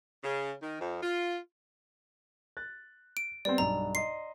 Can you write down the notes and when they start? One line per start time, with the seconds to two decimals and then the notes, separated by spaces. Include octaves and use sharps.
0.23 C#3
0.62 D#3
0.80 F2
1.01 F4
2.57 F#6 A6
3.17 D7
3.45 G3 B3 C4 D5
3.58 B1 G2 A#5
3.95 D#5 C6 C7